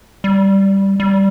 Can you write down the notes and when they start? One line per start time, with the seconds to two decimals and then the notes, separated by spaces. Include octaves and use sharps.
0.24 G3
1.00 G3